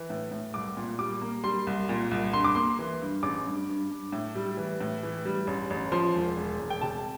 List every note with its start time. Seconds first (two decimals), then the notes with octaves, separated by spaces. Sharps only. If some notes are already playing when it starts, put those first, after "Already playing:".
Already playing: E3
0.10 A2
0.31 A2
0.54 C2 D6
0.77 A#2
0.99 G3 D6
1.21 A#3
1.44 G3 C6
1.67 C2
1.89 A#2
2.11 C2
2.33 G2 C6
2.44 D6
2.55 A#3 C6
2.79 E3
3.02 G2
3.23 A1 D6
3.46 G2
3.69 G2
3.91 G2
4.12 A2
4.36 G3
4.57 E3
4.80 A2
5.03 E3
5.25 G3
5.47 A1
5.70 A1
5.92 F3 C6
6.15 E1
6.37 E1
6.59 E1
6.70 G5
6.81 C3 A5